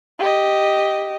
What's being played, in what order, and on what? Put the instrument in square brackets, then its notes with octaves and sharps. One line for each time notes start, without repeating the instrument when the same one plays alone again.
[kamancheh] G4 D#5